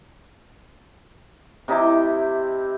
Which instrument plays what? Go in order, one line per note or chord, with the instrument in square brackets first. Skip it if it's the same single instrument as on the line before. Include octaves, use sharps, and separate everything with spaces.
[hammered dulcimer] C3 D#4 E4 D6